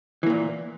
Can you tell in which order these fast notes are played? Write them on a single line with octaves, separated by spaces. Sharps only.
E3 A#3 A#2